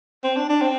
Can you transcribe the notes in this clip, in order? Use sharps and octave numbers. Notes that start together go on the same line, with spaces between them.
C4
D4
D4
C4